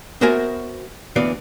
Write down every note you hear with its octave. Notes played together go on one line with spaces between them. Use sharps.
B3 F#4 A#4 C5 E5 G#5
D2 E3 B3 D5 F5